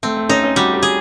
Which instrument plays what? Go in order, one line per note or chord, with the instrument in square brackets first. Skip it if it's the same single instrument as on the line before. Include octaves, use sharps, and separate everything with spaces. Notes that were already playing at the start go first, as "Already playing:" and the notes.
[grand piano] A3 [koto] C4
[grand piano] A3
[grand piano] C#4 [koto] D#4
[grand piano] C#4
[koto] G3 [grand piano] F#4
[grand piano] G4
[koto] G#4